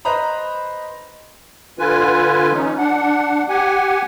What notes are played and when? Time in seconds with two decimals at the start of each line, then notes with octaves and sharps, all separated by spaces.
0.05 B4 C5 D#5 A#5 B5
1.79 D3 F4 B4 G#5
2.52 E3 C#4 D#4
2.78 D4 F#5
3.49 G4 F#5 G#5